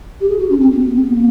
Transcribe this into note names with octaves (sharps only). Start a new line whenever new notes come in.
G4
G#4
F#4
C#4
C4
B3
C4
B3
C4
B3
A#3